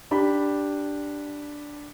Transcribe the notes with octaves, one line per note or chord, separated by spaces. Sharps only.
D4 G4 B5